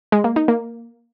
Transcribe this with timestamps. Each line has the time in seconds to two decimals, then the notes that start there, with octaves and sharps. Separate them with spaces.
0.12 G#3
0.24 A#3
0.36 D#4
0.48 A#3